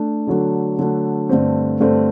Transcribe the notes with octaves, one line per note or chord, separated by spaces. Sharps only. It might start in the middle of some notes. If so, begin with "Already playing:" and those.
Already playing: A3 D4
D3 F#3 A3 D4
D3 F#3 A3 D4
G2 D3 A3 C4
G2 D3 A3 C4